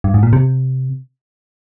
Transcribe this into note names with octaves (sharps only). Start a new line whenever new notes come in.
G2
G#2
A#2
C3